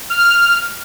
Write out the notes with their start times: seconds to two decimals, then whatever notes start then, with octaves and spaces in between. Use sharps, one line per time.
0.10 F6